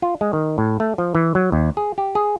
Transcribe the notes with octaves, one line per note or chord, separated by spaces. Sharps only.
F4
G#3
D#3
A2
A3
F3
E3
F#3
D#2
G#4
G4
G#4